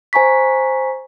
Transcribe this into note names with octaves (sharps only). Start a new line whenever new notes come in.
C5 G#5 A#5 C#6 B6